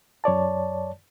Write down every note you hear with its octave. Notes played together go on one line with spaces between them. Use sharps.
F#2 C#5 D5 A5